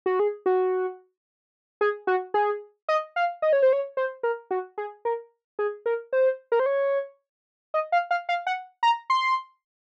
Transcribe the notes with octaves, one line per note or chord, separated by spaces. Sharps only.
F#4
G#4
F#4
G#4
F#4
G#4
D#5
F5
D#5
C#5
C5
C#5
C5
A#4
F#4
G#4
A#4
G#4
A#4
C5
A#4
C5
C#5
D#5
F5
F5
F5
F#5
A#5
C6